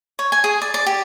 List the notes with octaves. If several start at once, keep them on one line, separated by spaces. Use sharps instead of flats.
C#5
G#5
G#4
D5
D5
G4